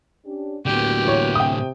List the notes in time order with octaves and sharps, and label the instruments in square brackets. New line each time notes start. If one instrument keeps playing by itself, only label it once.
[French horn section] C#4 D4 G4
[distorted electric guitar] A2 D3 [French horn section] A#3 B3 F#4 [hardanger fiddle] G4
[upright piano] E3 C#5
[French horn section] C3 [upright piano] G5 D#6